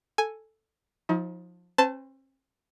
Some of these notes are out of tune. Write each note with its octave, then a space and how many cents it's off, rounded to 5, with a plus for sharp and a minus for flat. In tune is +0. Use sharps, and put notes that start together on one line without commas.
A4 +0 G#5 +0
F3 +25 D#4 +45
C4 +45 C5 -35 A5 +0